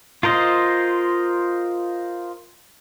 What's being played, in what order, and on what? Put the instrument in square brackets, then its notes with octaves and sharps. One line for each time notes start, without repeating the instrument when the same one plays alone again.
[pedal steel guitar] F4 A#4 C5 D#5